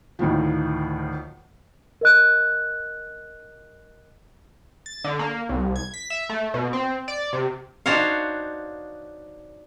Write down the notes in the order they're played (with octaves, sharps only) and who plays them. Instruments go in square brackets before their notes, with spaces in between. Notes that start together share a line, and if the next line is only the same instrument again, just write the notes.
[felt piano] D2 A2 D#3 F3
[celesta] A#4 D#5 F#6
[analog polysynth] A6
D3
A#3
C2
G#6
B6
E5
A3
B2
C4
D5
C3
[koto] D4 D#4 F#4 C5 C#5 F5